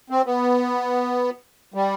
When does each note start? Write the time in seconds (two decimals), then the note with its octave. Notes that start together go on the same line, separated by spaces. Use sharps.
0.10 C4
0.26 B3
1.74 G3